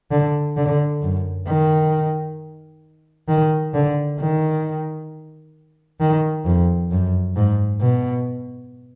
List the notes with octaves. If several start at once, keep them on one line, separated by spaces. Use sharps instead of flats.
D3
D3
F#2
D#3
D#3
D3
D#3
D#3
F2
F#2
G#2
B2